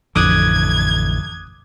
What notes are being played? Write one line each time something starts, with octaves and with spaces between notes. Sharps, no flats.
A1 F2 D3 D6 D#6 F#6 G#6